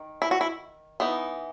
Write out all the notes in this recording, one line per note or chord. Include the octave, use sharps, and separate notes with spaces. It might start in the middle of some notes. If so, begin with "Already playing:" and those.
Already playing: D#3
E4
F#4
E4
E3 B3 D#4